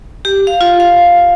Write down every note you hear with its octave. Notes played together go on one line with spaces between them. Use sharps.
G4
F5
F4
F5